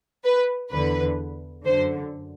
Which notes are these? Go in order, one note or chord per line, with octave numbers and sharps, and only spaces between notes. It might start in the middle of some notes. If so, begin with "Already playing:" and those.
B4
E2 D3 B4
F#2 D3 C5